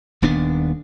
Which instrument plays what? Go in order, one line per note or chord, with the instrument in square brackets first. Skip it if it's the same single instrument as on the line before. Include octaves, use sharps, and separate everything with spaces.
[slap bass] D#1 D#2 B3 D4